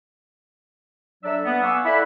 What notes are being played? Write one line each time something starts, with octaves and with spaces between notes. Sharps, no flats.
F#3 D4 A4 D5 E5 E6
B3
F5 F#5 G#5 C#6 D6 E6
E4 A4 D5 E5 F#5 B5